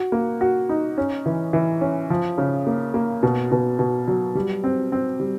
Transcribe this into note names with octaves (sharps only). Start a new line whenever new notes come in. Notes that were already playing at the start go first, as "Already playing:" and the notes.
Already playing: F#4
A#3
F#4
D#4
C#4
E3
E3
C#4
F3
C#3
A#3
A#3
B2
B2
B2
F#3
G3
C4
C4
G3